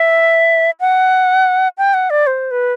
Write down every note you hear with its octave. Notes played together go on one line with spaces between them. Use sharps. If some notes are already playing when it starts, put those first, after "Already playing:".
Already playing: E5
F#5
G5
F#5
D5
C5
B4